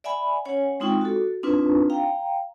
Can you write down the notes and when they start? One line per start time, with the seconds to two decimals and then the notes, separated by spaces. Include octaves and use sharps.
0.04 D5 E5 F#5 G#5 B5
0.45 C#4 C#5 F#5 G#5
0.80 G#3 C4 D#4 F4 G5 C#6
1.01 F#4 A4
1.43 C4 D4 D#4 F4 B4
1.90 F5 G5 A#5